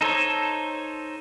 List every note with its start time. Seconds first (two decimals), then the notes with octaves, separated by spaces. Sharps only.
0.01 D#4 A4 C5 C#5